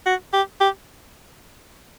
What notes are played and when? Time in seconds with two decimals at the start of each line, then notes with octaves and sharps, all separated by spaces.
0.06 F#4
0.33 G4
0.61 G4